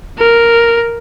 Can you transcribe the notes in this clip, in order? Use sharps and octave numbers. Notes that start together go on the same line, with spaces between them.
A#4